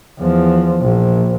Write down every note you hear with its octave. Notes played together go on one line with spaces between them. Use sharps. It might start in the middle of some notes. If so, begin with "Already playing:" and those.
E2 F3
A#1